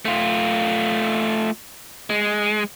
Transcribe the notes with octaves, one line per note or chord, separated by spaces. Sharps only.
A3 F4
G#3